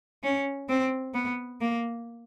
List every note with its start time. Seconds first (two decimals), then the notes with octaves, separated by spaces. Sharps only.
0.23 C#4
0.69 C4
1.14 B3
1.61 A#3